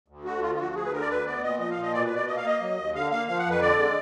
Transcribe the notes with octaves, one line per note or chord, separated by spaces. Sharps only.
D2
D3 F#4
D2 F4
F4
F3 F#4
D2 G#4
B4
D3 A#4
D5
D2 B4
B3 D5
A#2 D#5
F3 D#5
F5
A#2
D#5
B2 D5
B4
B2
D5
A#3 D#5
F5
A#3 D#5
F#3
D#2
D3 F5
A#3 F5
F3 F5
F#5
F2 B4
D3 D5
G#3